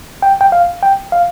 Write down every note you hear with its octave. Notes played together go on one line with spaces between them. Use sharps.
G5
G5
F5
G5
F5